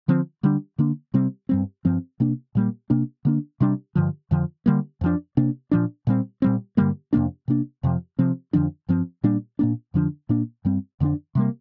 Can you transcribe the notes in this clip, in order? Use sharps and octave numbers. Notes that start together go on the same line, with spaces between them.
D3 F3 C4
D3 G3 D4
D3 A#3 D4
C3 G3 C4
G2 G3 C4
G2 F3 C4
C3 A#3 D4
A#2 G3 A#3
C3 A#3 D4
D3 A#3 D4
C3 G3 D4
G2 D3 F3
F2 D3 F3
D3 G3 A#3
F2 F3 D4
C3 A#3 D4
A#2 F3 D4
A#2 G3 C4
A#2 G3 C4
G2 D3 G3 A#3
F2 C3 A#3 D4
C3 A#3 D4
F2 C3 F3
C3 F3 C4
F2 D3 F3 D4
G2 F3 C4
A#2 G3 A#3 D4
A#2 A#3 D4
F2 D3 F3 D4
A#2 A#3 D4
G2 G3 C4
F2 D3 A#3 D4
C3 G3 A#3